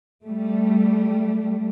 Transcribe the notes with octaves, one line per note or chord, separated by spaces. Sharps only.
G3 A3